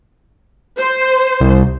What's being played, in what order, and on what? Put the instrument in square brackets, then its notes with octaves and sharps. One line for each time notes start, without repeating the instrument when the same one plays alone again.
[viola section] C5
[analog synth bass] C2